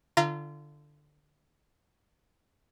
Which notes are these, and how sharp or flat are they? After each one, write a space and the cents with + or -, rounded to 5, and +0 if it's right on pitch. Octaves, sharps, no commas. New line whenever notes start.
D3 +10 F4 -30 A#5 +0